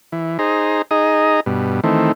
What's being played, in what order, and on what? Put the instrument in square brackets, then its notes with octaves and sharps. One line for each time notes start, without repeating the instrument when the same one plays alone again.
[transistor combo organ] E3
D#4 G#4 C5 A#5
D#4 G#4 D#5 A#5
G2 B2
D#3 E3 A3 C4